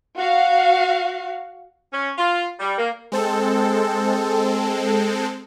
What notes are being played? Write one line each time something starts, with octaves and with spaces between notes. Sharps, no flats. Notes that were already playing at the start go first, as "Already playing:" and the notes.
F#4 F5
C#4
F4
G3
A#3
G#3 C4 A4